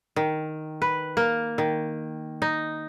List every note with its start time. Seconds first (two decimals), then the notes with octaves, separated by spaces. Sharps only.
0.16 D#3
0.82 B4
1.17 A#3
1.58 D#3
2.42 D#4